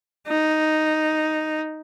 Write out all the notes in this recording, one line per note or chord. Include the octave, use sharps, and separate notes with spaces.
D#4